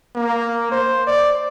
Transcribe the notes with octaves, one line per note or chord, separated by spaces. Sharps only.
A#3
C5
D5